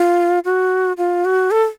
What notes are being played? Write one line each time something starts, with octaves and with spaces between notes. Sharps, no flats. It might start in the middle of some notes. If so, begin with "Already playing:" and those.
Already playing: F4
F#4
F4
F#4
A4